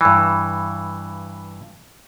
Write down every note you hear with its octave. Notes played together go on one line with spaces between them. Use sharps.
G2 E3